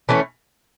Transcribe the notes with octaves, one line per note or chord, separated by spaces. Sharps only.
E3 A3 C#4